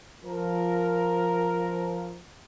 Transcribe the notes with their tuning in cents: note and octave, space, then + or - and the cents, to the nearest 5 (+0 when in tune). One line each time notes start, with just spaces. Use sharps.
F3 +0 A#4 +0